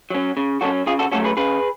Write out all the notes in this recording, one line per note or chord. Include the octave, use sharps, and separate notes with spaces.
F#3 C#4
C#3
F#3 C#4 F#4 A4
C#3 F4 G#4
F#4 A4
F#3 A3 C#4 F#4 A4
G#4 B4
C#3 G#4 B4